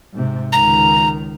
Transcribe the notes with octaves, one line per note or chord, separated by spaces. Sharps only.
G#2 C3
C#2 D#3 A#5